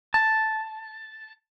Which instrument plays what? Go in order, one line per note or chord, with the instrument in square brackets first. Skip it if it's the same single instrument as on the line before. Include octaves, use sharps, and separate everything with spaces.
[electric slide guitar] A5